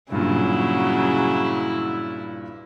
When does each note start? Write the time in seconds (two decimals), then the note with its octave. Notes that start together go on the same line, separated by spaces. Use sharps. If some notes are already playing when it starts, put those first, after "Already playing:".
0.12 G2 A#2 C#3 F#3 E4